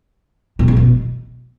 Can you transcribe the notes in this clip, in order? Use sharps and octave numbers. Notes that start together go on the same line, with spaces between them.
B2
C#3
B2